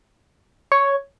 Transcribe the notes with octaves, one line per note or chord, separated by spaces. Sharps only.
C#5